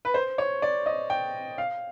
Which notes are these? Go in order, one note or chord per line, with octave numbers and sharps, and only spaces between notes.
B4
C5
C#5
D5
D#5
G5
F5